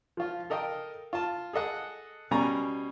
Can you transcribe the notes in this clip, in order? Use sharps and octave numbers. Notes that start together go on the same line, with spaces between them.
F3 F4
A4 A#4 D#5 F5 G5
F4 A5
G#4 A4 D#5 F#5
B2 G3 C#4 G#5 A#5